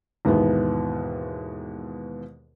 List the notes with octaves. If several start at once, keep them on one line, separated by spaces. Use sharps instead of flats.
D#2 G#2 B2 E3 B3